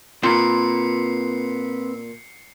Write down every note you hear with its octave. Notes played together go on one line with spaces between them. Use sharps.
A#2 C4 B4 C7 C#7